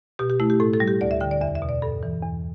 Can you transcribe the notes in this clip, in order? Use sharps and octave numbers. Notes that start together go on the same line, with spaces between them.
B2 G4
G4
A3 E4
G4
A2 A4
A4
G3
G4
D2 D5
E5
D3 G5
D5
E2 E5
E5
B2
D5
G2 A4
E3
E2